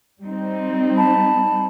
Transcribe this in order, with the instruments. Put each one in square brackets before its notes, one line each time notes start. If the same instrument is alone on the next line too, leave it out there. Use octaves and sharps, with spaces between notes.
[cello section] G3 C4 D#4
[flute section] A5 B5